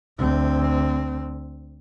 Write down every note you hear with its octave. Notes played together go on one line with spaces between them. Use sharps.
D2 C4